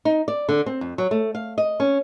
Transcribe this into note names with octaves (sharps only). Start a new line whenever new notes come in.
D#4
D5
D3
C4
F2
F#3
A3
F5
D#5
C#4